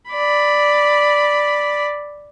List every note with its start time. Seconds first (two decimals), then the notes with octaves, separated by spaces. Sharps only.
0.10 D5 B5